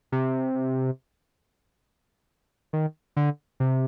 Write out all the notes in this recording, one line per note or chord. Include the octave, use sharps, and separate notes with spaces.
C3
D#3
D3
C3